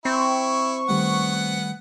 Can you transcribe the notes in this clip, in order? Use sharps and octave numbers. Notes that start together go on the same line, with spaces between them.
C4 E4 C#6
D#3 G3 A3 B3 F#5